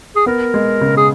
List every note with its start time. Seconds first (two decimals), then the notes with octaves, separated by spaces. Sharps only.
0.16 G#4
0.26 B3 A#4
0.54 G#3
0.81 C#3
0.97 G#4